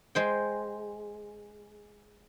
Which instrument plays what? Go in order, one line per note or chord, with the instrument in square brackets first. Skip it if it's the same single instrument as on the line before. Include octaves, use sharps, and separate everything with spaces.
[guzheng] G#3 C5 G5